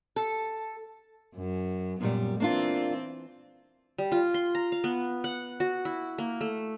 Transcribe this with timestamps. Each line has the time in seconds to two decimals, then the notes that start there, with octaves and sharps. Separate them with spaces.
0.16 A4
1.35 F#2
2.01 F#2 A#2 G3 B3
2.40 E3 A#3 C4 D4 F4
3.98 G3
4.12 F4
4.34 C6
4.55 A#5
4.72 F5
4.84 B3
5.24 F#5
5.60 F#4
5.85 E4
6.18 A#3
6.41 A3